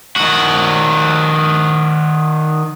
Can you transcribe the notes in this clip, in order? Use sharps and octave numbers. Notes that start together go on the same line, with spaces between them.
D#3 F#4